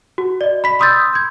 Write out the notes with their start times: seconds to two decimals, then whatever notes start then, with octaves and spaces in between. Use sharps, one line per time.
0.18 F#4
0.41 D5 D#5
0.64 B5 B6
0.79 B5 C6 D#6 E6 G6 A6
1.13 G6 G#6